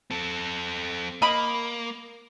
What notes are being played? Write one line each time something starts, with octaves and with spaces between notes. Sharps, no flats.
C4 A4
A#3 D#5 B5